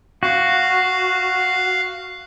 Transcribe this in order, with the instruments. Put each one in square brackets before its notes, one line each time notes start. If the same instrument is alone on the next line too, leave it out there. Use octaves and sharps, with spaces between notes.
[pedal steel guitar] F#4 [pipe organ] F5 F#6